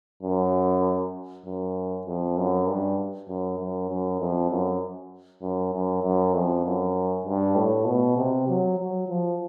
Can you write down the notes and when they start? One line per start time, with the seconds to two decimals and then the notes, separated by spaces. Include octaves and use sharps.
0.23 F#2
1.46 F#2
2.07 F2
2.38 F#2
2.68 G2
3.29 F#2
3.59 F#2
3.90 F#2
4.21 F2
4.51 F#2
5.42 F#2
5.73 F#2
6.03 F#2
6.34 F2
6.65 F#2
7.26 G2
7.56 A2
7.86 B2
8.17 C3
8.48 F#3
8.79 F#3
9.08 F3